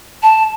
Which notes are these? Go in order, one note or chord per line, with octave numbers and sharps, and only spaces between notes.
A5